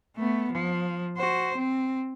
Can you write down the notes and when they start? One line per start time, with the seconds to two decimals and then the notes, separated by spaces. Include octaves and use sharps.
0.17 A3 B3
0.52 F3
1.17 F#4 C5
1.56 C4